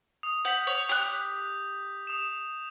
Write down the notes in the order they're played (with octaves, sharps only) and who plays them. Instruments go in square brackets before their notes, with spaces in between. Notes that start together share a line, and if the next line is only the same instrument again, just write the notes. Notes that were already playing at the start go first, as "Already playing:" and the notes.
[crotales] D#6
[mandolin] F#5 [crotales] G6 B6
[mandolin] C#5
G4 F#6
[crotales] D#6 E7